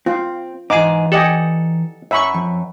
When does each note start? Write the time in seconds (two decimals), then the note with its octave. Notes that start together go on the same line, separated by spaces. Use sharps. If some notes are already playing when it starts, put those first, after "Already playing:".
0.06 C4 F4
0.70 G#2 E3 D#4 G#4 D6
1.12 G4 A4 D#5 F#5 G#5
2.11 F#2 E5 B5 C#6
2.34 F2